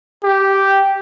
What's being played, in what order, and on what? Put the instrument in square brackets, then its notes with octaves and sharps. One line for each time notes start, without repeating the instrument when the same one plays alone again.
[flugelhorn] G4